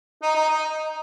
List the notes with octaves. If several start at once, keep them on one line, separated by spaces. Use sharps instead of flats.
D#4
D#4
D#4